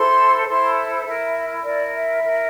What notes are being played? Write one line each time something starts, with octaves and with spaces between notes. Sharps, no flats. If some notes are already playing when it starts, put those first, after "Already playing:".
Already playing: E4 A4 C5 C6
E4 A4 C5 C6
E4 A#4 E5
E4 A#4 D5
E5
E4 A#4